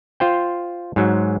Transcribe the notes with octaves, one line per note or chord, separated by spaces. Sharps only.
F4 C5 G5
G#2 F#3